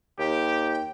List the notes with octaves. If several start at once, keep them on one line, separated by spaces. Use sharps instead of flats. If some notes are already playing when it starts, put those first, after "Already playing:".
D#2 G4 G5